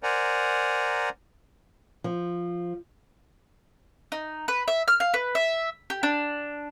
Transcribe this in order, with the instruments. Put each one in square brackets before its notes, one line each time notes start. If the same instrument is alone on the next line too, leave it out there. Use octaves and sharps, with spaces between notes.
[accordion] A#4 C5 D5 F#5 G#5 A#5
[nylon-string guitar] F3
[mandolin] D#4
B4
E5
F6
F5
B4
E5
G4
D4